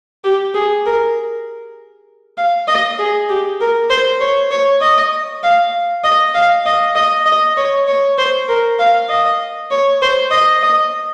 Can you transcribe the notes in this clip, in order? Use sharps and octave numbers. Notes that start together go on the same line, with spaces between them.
G4
G#4
A#4
F5
D#5
G#4
G4
A#4
C5
C#5
C#5
D#5
F5
D#5
F5
D#5
D#5
D#5
C#5
C#5
C5
A#4
F5
D#5
C#5
C5
D#5
D#5